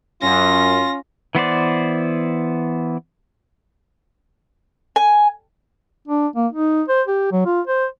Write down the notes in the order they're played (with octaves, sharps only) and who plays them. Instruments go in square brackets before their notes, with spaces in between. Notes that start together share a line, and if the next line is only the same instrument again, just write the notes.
[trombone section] F#2 [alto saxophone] C#4 [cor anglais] F4 [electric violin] A#6
[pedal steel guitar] E3 B3 C5 D5
[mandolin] G#5
[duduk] D4
A#3
D#4
C5
G4
F#3
F4
C5